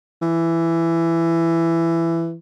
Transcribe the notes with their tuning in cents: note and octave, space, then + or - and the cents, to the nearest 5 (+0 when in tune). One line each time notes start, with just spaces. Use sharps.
E3 +15